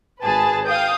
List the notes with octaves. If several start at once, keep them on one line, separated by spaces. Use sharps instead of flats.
G#1 G#4 B4 A5 A6
F5 G5 D#6 G6